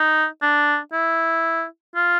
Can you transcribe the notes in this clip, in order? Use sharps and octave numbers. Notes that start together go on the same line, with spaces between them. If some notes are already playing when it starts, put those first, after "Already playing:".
Already playing: D#4
D4
E4
F4